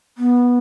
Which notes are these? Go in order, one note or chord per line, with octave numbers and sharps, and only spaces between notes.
B3